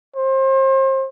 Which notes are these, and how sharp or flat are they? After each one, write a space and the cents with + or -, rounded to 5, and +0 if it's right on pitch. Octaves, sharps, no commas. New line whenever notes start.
C5 +35